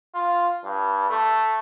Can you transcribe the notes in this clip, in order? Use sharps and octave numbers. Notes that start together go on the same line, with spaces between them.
F4
G2
A3